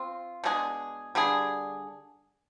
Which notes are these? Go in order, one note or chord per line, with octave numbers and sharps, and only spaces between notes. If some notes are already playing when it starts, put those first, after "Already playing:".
Already playing: C4 F4
B2 G#3 D4 G#4
D3 G3 D4 G#4